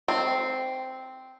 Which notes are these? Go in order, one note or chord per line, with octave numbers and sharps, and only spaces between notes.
C4